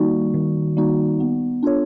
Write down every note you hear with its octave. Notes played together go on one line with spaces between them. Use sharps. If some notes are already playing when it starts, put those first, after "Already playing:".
Already playing: D#3 G3 A#3 D#4 F#4
D#3
G3 A#3 D#4 F#4
B3
D4 F4 A4 C#5